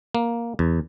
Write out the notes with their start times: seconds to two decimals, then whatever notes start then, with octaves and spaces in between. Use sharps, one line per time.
0.15 A#3
0.59 E2